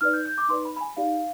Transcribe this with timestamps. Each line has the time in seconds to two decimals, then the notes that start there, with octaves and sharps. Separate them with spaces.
0.01 D#4 B4 D5 F6
0.13 G6
0.26 G6
0.38 D6
0.49 D#4 B4 D5 C6
0.65 B5
0.76 B5
0.81 G#5
0.97 D#4 G4 D5 F5